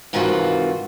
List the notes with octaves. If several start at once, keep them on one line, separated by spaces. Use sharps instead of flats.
G#2 C3 D#3 E3 F4 F#4